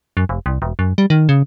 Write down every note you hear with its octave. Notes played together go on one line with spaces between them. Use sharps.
F#2
F1
C2
E1
F#2
G3
D#3
C#3